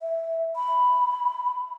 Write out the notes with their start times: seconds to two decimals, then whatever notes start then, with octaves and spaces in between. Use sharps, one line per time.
0.01 E5
0.56 B5